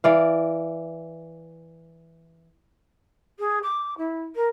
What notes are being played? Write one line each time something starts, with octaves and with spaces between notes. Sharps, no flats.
E3 D5 F5
G#4
D6
E4
A#4